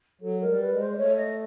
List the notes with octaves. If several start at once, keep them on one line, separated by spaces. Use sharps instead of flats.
F#3 A4
G#3 A#4
G3
B4
G#3
C5
D5
A3 C#5
D#5